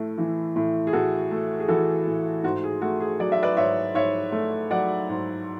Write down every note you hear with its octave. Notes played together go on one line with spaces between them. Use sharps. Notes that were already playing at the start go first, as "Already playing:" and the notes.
Already playing: A2 A3
E3
A2
G#4
A2 F#4 A4
A3
G#4
E3 F#4 A4
A2
G#2 F#4
G#4
A3 F#4
G#4
F#3 D5
E5
B4 D5
G#2 C#5 E5
G#2 C#5 E5
A3
F#3 D5 F#5
G#2